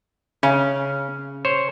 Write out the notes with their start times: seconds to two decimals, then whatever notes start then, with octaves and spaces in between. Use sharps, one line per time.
0.43 C#3 C#4
1.45 C5 C#5